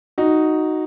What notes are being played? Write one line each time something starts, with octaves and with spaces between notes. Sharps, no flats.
D#4 F#4